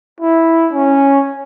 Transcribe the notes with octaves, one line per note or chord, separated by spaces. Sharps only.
E4
C#4